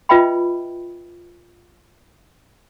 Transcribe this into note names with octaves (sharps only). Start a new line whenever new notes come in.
F4 B4 D#5 E5 G5 B5